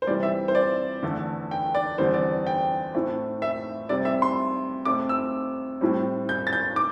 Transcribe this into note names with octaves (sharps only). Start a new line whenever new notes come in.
C5
C3 E3 G3 C4 D5
E5
C5
D5
E2 D3 A3
G5
D5
E2 D3 G3 C4 C5
D5
G5
A2 A3 C4
E5
C3 G3 C4 D5
E5
C6
C3 A3 C4 D6
E6
A2 G3 C4
G6
A6
G6
D6